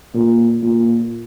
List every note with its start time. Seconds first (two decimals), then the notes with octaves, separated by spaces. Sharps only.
0.14 A#2
0.63 A#2